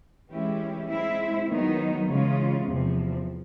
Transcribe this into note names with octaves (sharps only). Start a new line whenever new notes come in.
E3 G#3 C#4 E4 G4
G#3 C4 E4
D#3 F#3 B3 D#4
C#3 E3 G#3 C#4 F4
E2 C3 F3